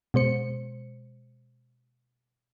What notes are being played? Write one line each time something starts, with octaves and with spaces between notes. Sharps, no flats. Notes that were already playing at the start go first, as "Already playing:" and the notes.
B2 G#3 C5 C#7